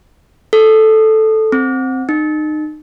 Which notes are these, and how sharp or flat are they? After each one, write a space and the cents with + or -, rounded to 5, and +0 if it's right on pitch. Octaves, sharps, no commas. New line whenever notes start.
A4 -5
C4 +0
D#4 -30